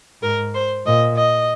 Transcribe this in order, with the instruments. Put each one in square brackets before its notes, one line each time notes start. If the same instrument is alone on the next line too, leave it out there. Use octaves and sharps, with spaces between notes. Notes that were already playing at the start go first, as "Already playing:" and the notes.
[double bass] G#2 [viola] A#4
[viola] C5
[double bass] A#2 [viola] D#5
[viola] D#5